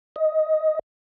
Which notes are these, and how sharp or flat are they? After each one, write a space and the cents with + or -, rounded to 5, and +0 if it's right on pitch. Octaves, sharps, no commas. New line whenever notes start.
D#5 +10